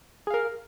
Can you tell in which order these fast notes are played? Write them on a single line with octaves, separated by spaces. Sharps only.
G#4 F5 A#4